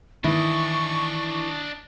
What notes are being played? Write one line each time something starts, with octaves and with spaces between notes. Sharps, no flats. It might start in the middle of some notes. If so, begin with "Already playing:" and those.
D#3 E3 D4 E4 D#5 C#6